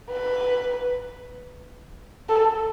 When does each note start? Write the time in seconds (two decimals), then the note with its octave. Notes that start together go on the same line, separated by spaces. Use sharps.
0.11 B4
2.29 A4